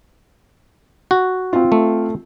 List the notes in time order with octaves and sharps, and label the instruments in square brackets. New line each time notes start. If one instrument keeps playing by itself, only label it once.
[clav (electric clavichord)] F#4
[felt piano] C4 F4
[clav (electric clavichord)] A3